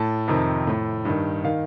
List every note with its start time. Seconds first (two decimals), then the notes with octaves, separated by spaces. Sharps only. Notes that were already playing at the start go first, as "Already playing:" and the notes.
Already playing: A2 A5
0.28 F2 C3 D#3
0.67 A2
1.05 G2 D#3
1.44 D#3 F5